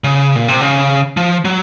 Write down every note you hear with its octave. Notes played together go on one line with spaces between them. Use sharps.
C#3
A#2
C3
C#3
F3
F#3